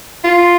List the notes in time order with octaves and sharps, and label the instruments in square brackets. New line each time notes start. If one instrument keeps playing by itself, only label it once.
[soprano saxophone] F4